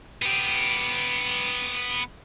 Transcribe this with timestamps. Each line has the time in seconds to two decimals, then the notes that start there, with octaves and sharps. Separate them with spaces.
0.22 B3 G4